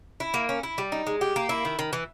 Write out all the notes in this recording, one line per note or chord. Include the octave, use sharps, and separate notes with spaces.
E4
A#3
C#4
E4
G3
D#4
G#3
G4
A#3
E4
D#3
D#3
E3